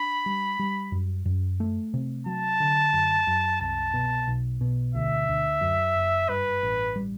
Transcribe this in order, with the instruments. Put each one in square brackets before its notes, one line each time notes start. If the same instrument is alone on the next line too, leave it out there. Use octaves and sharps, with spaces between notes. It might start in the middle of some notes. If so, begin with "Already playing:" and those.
Already playing: [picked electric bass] D4 [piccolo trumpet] B5
[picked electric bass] G3
G3
F#2
F#2
A3
C3
[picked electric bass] F#3 [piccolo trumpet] A5
[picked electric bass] D3
F#2
F#2
[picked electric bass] C2 [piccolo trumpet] A5
[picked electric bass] B2
B1
B2
[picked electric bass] D2 [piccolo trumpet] E5
[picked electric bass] D2
F#2
F#1
[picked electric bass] G2 [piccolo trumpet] B4
[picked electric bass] A1
G3